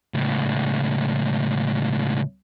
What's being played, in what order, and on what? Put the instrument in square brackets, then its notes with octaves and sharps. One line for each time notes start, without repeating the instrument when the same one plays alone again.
[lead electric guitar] C#2 A2